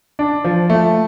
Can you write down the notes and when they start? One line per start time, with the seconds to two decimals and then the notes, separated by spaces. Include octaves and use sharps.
0.19 D4
0.44 F3
0.70 A3